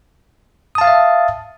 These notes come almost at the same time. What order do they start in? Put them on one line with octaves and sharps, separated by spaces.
D#6 A5 F5 A6 E5